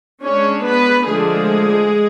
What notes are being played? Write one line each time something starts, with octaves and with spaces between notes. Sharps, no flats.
G#3 C#4 D4 C#5
B3 B4
D3 F3 G#3 A3 D4 G#4